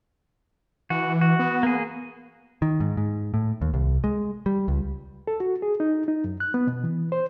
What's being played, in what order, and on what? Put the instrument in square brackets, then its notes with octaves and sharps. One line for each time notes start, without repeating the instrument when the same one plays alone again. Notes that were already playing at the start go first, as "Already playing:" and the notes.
[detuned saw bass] E3 [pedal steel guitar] F#4
[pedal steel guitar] F#4
[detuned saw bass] B3
[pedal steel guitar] A#3 G#4
[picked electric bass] D#3
G#2
G#2
A2
D#2
C2
G#3
G3
C#2
[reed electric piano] A4
F#4
G#4
D#4
D#4
F#2
F#6
B3
B2
E3
C5